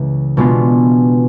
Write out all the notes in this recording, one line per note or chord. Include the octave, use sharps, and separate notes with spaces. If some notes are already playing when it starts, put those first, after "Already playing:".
Already playing: C#2 C#3 E3 C#4
B2 G#3 B3 D4 F4